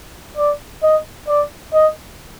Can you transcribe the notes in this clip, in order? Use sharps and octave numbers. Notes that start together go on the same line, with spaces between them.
D5
D#5
D5
D#5